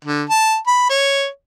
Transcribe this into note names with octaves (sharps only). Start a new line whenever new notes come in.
D3
A5
B5
C#5